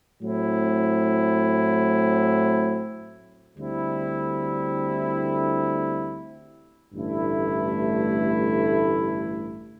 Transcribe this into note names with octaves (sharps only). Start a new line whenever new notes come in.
A2 F#3 C4 E4
D2 D3 G3 C4 E4
A1 G2 D3 A3 E4